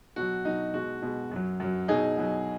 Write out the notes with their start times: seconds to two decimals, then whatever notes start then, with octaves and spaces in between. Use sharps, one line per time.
0.16 B2 F#3 F#4
0.45 B2 F#3 D#4
0.74 B2 G#3 F#4
1.02 B2 G#3
1.31 F#2 F#3
1.60 F#2 F#3
1.88 B2 F#3 D#4 G#4
2.18 B2 F#3